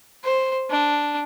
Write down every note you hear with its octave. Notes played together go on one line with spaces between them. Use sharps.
C5
D4